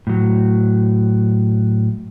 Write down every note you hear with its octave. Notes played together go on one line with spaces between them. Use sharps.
A2 F#3